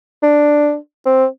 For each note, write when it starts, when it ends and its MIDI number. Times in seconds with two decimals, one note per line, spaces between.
0.23 0.75 62
1.06 1.25 60